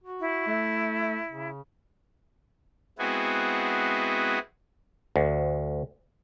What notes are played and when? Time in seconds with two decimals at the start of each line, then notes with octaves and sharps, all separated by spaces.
0.04 F#4
0.20 E4
0.47 A3
1.31 C#3
2.99 G#3 B3 C4 E4 F#4 G#4
5.16 D2